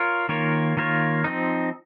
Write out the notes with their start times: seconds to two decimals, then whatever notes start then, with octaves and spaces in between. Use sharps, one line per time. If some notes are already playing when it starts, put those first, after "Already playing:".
Already playing: F4 A#4 C#5
0.29 D#3 A#3 F4 A#4 C#5
0.77 D#3 A#3 F4 A#4 C#5
1.24 F3 C4 D#4